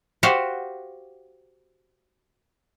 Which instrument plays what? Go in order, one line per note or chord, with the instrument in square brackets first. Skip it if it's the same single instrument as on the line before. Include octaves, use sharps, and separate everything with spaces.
[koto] F#4 G4 C5 F5 F#5